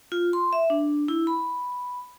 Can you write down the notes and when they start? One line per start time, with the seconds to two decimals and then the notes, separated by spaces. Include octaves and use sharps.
0.12 F4
0.33 C6
0.53 E5
0.70 D4
1.08 E4
1.27 B5